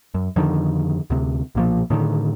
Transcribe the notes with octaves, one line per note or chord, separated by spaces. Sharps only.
F#2
F2 D3 D#3
D2 C3
B1 A#2 F3
A2 D3 D#3